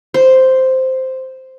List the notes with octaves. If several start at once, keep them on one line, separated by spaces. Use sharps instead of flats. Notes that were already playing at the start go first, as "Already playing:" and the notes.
C5